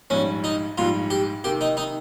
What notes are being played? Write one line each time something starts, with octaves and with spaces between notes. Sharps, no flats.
A#1 G#2 G3 C#4
D#4
A#1 G#2 G3 F4
G4
C3 D#3 A#3 G4
D#4
D#4